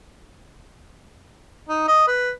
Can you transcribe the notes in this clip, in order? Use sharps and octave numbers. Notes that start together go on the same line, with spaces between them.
D#4
D#5
B4